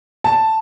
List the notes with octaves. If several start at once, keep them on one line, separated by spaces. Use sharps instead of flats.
A5